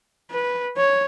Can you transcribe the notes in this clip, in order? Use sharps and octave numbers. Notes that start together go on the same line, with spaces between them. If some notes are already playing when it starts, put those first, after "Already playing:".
B4
C#5